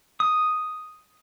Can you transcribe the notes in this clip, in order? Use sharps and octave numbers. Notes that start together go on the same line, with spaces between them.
D#6